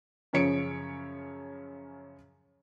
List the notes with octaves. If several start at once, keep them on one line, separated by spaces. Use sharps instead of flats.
F#2 C#3 F3 C#5 C#7 D7